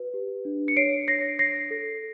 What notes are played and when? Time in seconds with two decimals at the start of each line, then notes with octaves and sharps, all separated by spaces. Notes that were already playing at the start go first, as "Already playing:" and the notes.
Already playing: F#4 B4
0.14 G4
0.45 D4
0.68 C#7
0.77 C#5 C7 D7
1.08 C#5 A#6 C7
1.39 C#5 A#6 C7
1.71 A4